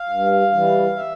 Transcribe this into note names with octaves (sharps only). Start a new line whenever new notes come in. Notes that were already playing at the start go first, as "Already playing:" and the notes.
Already playing: F5
G2
E3 G3
E5